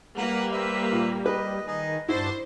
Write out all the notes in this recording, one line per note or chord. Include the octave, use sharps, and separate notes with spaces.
G3 A#3 A#4 B4 F#5
B4 C5 E5
A#2
B4 D#5
D#3 D#4 G#4
G2 D4 E4 F#4 C5 A5